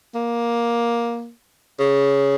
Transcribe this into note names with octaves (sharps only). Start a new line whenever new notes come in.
A#3
C#3